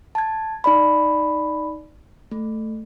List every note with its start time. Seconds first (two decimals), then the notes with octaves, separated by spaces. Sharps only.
0.15 A5 G#6
0.64 D#4 D5 B5
2.31 A3